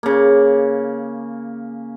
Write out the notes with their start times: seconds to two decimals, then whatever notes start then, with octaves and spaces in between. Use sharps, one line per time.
0.03 C#3 A#3